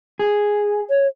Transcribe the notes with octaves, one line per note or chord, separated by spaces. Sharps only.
G#4
C#5